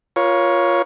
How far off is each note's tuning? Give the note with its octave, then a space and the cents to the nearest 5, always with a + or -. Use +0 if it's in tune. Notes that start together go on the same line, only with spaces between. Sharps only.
F4 +0 A#4 +35 C#5 +0